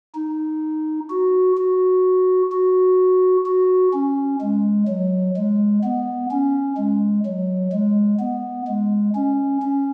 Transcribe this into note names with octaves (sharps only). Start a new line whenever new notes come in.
D#4
F#4
F#4
F#4
F#4
C#4
G#3
F#3
G#3
B3
C#4
G#3
F#3
G#3
B3
G#3
C#4
C#4